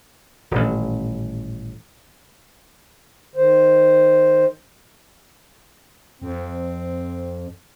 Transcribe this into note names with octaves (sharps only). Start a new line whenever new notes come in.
D#1 A1
D#3 C5
F2 C4